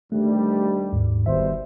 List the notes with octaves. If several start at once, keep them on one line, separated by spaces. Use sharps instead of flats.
D2 D#3 G3 A3
D#2 G#2
G1 B2 D#3 G3 C5 E5